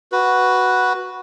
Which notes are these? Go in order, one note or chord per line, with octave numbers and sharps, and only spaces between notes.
F#4 B4